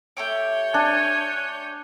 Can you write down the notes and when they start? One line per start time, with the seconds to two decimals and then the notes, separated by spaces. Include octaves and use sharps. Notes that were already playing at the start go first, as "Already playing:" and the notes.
0.17 A3 G4 C#5 D6 G6
0.74 D4 G#5